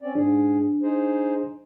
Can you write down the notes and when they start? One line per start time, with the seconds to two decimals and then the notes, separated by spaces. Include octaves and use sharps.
0.02 C4 C#4 D5
0.15 G#2 D4 G#4
0.82 D#4 G#4 C5